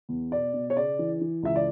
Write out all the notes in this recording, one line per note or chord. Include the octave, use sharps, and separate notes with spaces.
E2
B2 D5
B2
C#5
C#3 D5
E3
E3
C#2 E5
D5